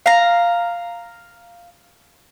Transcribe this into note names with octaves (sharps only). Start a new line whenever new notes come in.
F5 A#5